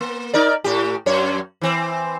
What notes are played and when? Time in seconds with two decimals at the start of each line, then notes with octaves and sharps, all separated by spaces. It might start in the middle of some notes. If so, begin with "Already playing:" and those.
0.01 A#3
0.33 D#4 A#4 D5
0.64 A2 G4
1.06 F#2 C#5
1.61 E3 C4